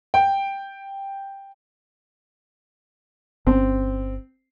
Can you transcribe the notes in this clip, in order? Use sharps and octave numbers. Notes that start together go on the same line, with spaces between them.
G5
G1 C4 C#4